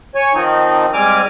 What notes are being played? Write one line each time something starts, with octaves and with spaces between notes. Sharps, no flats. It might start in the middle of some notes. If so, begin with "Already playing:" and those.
C#5 G#5
D#3 F3 C4 D#4
G#2 G3 C4 G#5 D6 F6